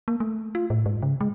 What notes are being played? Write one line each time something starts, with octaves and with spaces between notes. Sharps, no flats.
A#3
A3
F4
A2
G#2
C#3
G#3